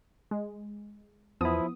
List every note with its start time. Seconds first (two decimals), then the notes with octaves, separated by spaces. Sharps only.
0.31 G#3
1.41 E2 F3 B3 E4 D#6